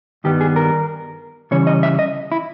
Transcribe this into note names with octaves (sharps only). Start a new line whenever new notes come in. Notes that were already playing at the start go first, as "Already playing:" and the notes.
G2 D#3 G3 B3 G4
G#4
A#4
C#3 E3 G3 C#4 C#5
D#5
E5
D#5
E4